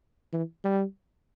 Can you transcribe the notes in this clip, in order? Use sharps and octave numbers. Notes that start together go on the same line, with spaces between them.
E3
G3